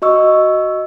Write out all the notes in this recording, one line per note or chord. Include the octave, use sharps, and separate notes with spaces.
F#4 D#5 C#6 E6